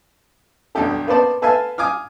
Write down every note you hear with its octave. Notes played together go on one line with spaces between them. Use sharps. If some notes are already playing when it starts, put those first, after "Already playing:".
B1 E2 G2 G4 A4
A#3 B3 B4 C5 D5 A5
A4 B4 E5 F5 G#5 A5
G#5 D6 D#6 F6